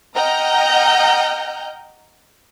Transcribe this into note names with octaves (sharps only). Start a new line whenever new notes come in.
D#5 F#5 G5 A#5 F6 G6